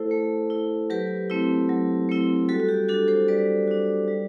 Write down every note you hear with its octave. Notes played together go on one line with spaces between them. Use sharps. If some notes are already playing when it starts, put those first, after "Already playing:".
Already playing: A3 E4 A4 C5
A3
E4
F#3 G4 B4
A3 C4 E4
F#3
A3 C4 E4
G3 F#4 A4
F#4
G4
D4 F#4 A4
A4 C5
G3 B4 D5
D4 F#4
G3